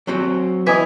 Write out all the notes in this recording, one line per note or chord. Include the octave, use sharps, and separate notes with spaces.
F#3 C4 F#4
E3 D#5 E5 G#5